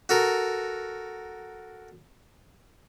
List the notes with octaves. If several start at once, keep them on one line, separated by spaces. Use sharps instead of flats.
F#4 A4 A#4